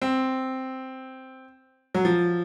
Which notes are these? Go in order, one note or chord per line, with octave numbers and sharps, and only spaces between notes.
C4
F#3
F3